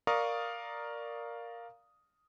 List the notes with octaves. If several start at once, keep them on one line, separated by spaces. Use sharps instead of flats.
A#4 D5 F5 A#5 C#6 D#6